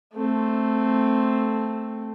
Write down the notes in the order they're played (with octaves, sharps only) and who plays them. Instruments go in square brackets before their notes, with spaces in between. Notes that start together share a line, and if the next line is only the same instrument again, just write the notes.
[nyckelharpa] A3 C4